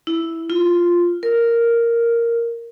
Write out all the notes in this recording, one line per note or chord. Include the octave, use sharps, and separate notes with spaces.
E4
F4
A#4